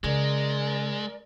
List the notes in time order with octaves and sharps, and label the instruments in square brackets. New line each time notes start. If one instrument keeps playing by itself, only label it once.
[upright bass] C#3 [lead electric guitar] G#3 [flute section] A#4 D5